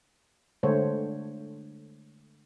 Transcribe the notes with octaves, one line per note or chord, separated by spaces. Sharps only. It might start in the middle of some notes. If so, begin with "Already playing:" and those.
D3 G#3 A3 A4 C5 C#5